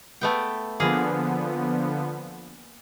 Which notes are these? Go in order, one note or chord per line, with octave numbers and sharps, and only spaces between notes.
A3 B3 G5
D3 F3 A#3 B3 G#4